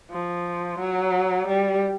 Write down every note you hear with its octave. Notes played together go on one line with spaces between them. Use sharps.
F3
F#3
G3